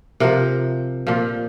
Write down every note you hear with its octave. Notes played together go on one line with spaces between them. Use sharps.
C3 F3 A#4
A#2 F3